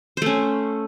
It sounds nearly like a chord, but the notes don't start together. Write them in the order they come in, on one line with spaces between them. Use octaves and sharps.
C5 A3 C#4